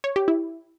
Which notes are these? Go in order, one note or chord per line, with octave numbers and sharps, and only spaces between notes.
C#5
G4
E4